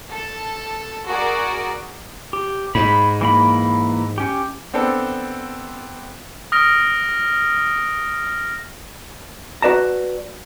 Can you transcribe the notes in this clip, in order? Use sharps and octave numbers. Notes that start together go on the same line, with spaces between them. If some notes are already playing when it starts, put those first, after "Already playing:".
A4
F#4 G#4 A#4 D5
G4
G#2 B5
E3 A#3 B5
C#4 G4
B3 C4 D4 A4
D#6 F6 A#6 D7
F#4 B4 D5 A5 A#5